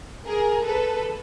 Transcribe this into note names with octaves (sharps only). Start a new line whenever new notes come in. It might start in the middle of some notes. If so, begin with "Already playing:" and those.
G#4 A#4
A4 B4